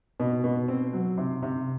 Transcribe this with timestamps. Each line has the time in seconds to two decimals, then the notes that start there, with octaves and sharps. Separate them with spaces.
0.20 B2
0.44 B2
0.68 C4
0.93 F#3
1.18 C3
1.43 C3